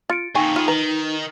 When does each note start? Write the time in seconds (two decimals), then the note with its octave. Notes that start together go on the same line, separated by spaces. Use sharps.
0.10 F4 A6 C#7 D7
0.35 F2 A#2 D#4 G5 G#5 C#6
0.56 B3 F4 G#4
0.68 D#3 B4 A#5